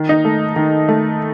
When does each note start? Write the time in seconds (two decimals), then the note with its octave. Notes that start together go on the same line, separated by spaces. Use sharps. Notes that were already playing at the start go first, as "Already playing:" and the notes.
Already playing: D#3
0.09 D#4
0.25 A3
0.56 D#3
0.88 A3